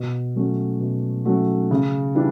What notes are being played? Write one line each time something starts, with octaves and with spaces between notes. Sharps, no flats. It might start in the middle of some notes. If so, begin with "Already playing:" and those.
Already playing: B2
F#3 A3 C#4 F#4
B2
F#3 A3 C#4 F#4
C#3
E3 G3 D4